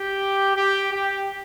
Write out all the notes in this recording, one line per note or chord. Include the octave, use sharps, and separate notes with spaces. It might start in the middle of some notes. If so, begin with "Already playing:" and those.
Already playing: G4
G4
G4